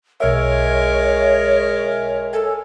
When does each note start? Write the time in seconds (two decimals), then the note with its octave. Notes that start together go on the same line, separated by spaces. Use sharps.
0.20 B1 G#3 A#4 C#5 E5
2.33 A4 G#5